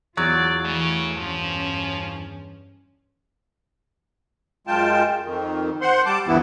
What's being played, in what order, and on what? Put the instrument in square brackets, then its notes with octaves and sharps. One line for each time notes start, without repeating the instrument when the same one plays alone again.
[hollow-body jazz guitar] E2 [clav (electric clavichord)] F#3 [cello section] F4 [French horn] D5
[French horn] C#3 [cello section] E3 A3
[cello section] G2 C#4 [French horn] F3
[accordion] F#2 G#3 F4 G5 A5
F2 D#3
C5 F#5 C6
G3 A5 D6
D2 G2 E3 B3 E4